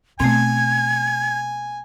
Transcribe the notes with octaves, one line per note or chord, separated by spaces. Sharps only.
B2 A3 C4 G#5 G#6